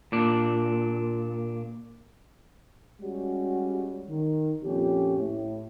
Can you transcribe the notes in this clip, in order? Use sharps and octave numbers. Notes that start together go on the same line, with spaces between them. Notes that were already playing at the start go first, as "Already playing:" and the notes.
A#2 D4
G3 G#3 C#4 F#4 G4
D#3
F2 A#2 C#4 G4
A2